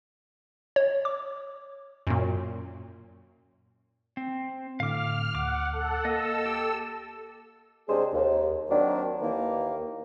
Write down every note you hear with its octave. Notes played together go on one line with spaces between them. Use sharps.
C#5
D6
F#2 A#2
C4
A2 D3 F5 D6 F6
D2 F#5 D6 F6
A4 F#5
A#3 A4 D#5 E6
G4
C3 G#3 C#4 D4 G#4 C5
D#2
D#3 F#3 A#3 C4 D4
D#2 D#3 E3 A#3